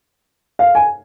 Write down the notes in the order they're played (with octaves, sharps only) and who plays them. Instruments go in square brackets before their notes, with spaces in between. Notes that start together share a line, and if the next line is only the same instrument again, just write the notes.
[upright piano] F5
G#5